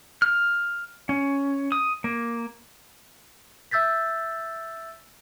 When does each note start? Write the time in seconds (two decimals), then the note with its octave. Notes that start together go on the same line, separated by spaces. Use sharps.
0.22 F6
1.09 C#4
1.72 D#6
2.04 A#3
3.71 E5 E6 G6 A6 B6